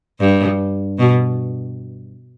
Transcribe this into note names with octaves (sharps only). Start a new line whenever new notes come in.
G2
B2